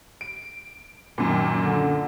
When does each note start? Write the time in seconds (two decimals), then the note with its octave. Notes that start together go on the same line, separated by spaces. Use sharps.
0.21 D7
1.18 F#2 A#2 D#3
1.56 D3